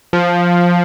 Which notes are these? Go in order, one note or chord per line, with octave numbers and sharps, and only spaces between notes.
F3